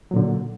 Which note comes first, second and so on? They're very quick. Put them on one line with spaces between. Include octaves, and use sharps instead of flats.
F#3 A#2 D3